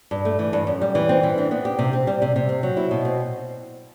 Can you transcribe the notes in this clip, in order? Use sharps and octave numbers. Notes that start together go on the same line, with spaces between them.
G2
A3
E3
G2
F#2
G3
E3
C4
E3
D4
B3
G4
C3
C4
G3
C3
C3
C4
F#3
E4
B2
C4